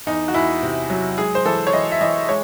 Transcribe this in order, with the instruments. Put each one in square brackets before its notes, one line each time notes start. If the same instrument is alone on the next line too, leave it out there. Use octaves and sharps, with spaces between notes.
[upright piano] E2 D#4
F#4
E2 E4
C3
F#3
G#3 G#4
C5
E3 A4
C#5
E3 D#5
E5
E3 D#5
G#3 C#5